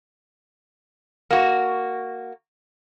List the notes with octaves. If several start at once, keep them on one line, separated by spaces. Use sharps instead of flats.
A#3 F#4